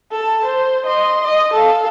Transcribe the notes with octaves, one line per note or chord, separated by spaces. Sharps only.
A4 A5
C5
D#5 C6
D#5
A4 F5